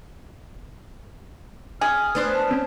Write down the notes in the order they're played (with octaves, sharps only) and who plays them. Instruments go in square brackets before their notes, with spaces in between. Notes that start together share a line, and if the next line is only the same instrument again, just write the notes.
[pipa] G#4 [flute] F6
[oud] B3 D4 C5
[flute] A5
[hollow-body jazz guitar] C4 C#4